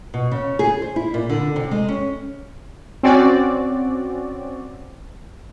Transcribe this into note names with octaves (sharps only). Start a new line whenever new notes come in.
B2
C#3
G#4
C5
E4
A#2
D3
C3
G#3
C#4
C4 C#4 F#4 D5